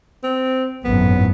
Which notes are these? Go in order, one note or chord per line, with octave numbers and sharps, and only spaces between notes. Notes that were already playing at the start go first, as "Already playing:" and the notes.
C4
G#1 F#2 A2 B3